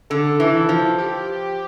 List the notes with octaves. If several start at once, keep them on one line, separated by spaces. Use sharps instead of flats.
D3 A4
E3
F3
G4